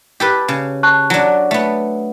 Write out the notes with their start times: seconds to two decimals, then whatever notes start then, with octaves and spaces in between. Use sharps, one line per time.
0.20 G4 A4 B4
0.48 C#3
0.83 A5 C#6 F#6
1.10 F#3 D4
1.51 A3 B3